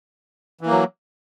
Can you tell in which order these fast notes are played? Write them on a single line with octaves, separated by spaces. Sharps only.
E3 A#3 F#3